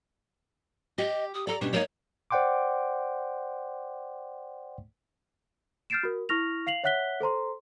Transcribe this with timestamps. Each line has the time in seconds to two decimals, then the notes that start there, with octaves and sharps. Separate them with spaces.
0.98 G4 D#5
1.34 D#6
1.47 A4 D5 A#5
1.61 B2 G3 C#4 D4
1.73 G3 A#3 D#4 C#5
2.31 C5 D5 F#5 G5 C6 D6
5.90 F6 G6 A6 C7 D7 E7
6.03 F#4 A#4
6.29 E4 C#6 F6 A#6 F7
6.67 F5 C7 F7 F#7
6.84 C#5 E5 F#5 F#6 B6 G7
7.20 A4 C5 A#5 C6